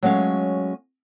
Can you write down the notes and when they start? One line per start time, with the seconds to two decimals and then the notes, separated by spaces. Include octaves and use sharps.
0.03 F#3 G#3 A3 C#4 F5